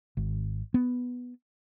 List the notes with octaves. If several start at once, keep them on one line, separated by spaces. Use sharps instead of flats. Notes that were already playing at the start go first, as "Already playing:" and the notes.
G#1
B3